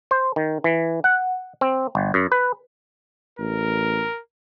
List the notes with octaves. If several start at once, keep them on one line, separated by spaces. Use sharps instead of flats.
C5
D#3
E3
F#5
C4
G1
F#2
B4
A1 A#4